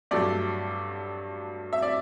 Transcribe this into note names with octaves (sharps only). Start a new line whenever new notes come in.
G2 F#3 A3 D5
E5
D5